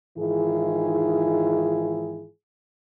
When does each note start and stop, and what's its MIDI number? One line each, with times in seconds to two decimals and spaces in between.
0.17 2.27 44
0.17 2.27 51
0.17 2.27 52
0.17 2.27 64
0.17 2.27 65
0.17 2.27 68